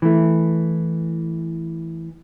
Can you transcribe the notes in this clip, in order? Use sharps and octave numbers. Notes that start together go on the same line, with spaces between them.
E3 A3